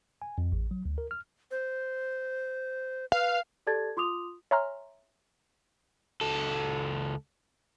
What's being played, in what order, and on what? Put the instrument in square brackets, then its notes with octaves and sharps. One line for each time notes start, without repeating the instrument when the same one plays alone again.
[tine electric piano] G#5
F2
A1
F#3
D2
A#4
F6
[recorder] C5
[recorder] B4 [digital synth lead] F5
[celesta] G4 A4 D5 A5 G#6 A6
F4 C6 D6 D#6 F7
[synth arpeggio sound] C#5 E5 G#5 A#5 C6 F6
[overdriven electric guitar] C#2 A4